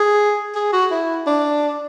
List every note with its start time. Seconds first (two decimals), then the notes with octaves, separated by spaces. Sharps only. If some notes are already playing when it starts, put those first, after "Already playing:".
Already playing: G#4
0.55 G#4
0.73 F#4
0.91 E4
1.27 D4